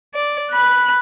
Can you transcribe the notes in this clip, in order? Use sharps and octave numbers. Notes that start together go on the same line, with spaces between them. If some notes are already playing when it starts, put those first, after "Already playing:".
D5
B5 F#6